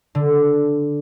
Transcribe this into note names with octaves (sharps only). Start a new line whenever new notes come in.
D3